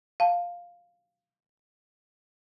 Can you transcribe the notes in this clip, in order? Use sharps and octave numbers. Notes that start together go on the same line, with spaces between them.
F5 A5